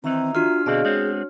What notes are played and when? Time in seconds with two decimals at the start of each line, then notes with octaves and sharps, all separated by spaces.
0.04 D#3 E3 C4 D#4 E5 A#5
0.35 D4 F4 F#4 F6
0.66 B2 D3 C4 G#4 D5 D#5 F5
0.85 G#3 B3 C4 C#5